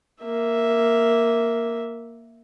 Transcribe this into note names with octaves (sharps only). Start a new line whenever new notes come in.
A#3 E5